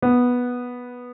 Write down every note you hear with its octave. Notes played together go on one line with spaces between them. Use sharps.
B3